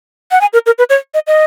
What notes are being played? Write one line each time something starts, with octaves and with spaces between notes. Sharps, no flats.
F#5
G#5
A#4
A#4
B4
C#5
D#5
D#5